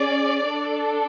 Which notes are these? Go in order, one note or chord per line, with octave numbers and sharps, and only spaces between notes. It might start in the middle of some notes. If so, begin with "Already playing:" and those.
Already playing: C#4 G#4 D5
D4 A4